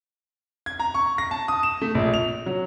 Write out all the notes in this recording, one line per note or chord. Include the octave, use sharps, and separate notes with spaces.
G#6
A#5
C#6
A#6
A5
D#6
E7
A3
A#1
F7
F#3